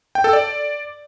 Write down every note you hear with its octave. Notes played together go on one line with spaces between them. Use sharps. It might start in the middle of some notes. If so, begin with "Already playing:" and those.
G5
A4
D5